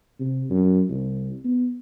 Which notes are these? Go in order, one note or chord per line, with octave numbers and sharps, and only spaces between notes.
C3
F#2
C2
B3